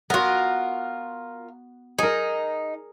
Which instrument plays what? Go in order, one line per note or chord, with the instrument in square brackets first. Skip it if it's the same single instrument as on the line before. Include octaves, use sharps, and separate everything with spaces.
[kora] B3 F#4 [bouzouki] F4 A#4
[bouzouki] D#4 [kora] G#4 A#4